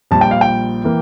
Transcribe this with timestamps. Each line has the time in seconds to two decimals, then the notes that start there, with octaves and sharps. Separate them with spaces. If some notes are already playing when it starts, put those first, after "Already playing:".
0.11 A#1 A#2 G3 A5
0.21 G5
0.31 F5
0.41 G5
0.84 E3 A#3